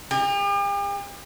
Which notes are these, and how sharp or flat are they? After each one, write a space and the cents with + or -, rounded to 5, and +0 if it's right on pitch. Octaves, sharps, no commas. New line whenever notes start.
G4 +45